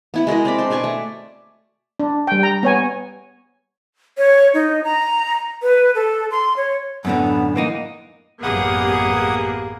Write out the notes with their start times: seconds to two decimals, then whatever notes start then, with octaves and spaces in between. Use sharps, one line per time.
0.14 B3 E4 F#5
0.27 G#3 F#4 A#4 D#5
0.45 C4 D5 B5
0.59 D4 C5
0.70 B2 D5 G#5 C#6
0.84 A3
2.00 D4
2.27 G3 G5
2.43 A#5
2.63 B3 C#5 G#5
4.18 C#5
4.54 D#4
4.84 A#5
5.63 B4
5.95 A4
6.31 C6
6.57 C#5
7.05 F#2 A2 D3 B3
7.56 E3 A#3 D#4
8.43 A1 F#2 A#3 B3 G4 G#4 F#5 D#6